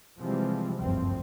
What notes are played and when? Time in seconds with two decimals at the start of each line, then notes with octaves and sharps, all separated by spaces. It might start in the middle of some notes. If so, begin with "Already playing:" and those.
0.20 C3 E3 F3 G3 G#3 C4
0.79 F#1 D2 G2 F3 C4